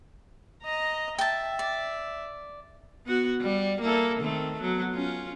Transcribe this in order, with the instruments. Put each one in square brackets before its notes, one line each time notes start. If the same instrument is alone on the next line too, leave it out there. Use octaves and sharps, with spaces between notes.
[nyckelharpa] D#5 A#5
[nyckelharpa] E5 [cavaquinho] G5 A5
[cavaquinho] D5
[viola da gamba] B3 F#4
G3
A#3 E4 A4
D#3 A3 C4
F#3 B3
C#4 F4